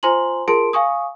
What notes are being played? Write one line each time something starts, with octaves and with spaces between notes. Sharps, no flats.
F4 C5 G#5 A#5 C6 F#7
F4 G#4 A#4 A5 C6 D7
F5 G#5 C#6 D#6